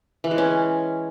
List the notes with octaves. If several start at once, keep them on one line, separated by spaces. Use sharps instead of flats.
E3
G#3
C#4